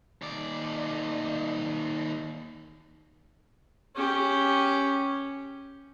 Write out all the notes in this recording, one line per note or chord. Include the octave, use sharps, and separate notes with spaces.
D#2 D5
C#4 G4